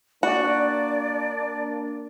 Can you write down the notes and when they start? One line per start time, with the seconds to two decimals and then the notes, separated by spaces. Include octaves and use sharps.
0.23 A#3 D4 F#4 D5